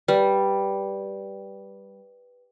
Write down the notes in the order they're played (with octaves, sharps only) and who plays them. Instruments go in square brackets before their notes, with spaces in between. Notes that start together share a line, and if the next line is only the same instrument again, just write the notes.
[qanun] G3 [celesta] B4